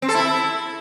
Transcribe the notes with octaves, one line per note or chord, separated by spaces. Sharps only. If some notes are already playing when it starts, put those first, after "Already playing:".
C4
A4
E4